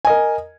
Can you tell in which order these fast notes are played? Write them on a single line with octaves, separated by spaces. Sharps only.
G#5 D#5 A#4